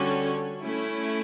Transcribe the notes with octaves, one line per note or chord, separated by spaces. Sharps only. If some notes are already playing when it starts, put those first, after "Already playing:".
Already playing: D3 G3 C#4 F#4 A4
A3 C#4 E4